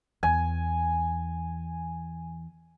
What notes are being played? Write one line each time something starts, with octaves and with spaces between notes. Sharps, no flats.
E2 G#5